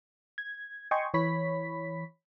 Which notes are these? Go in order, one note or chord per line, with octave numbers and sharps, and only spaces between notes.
G#6
D#5 G5 G#5 C6 C#6
E3 C#5 B5 B6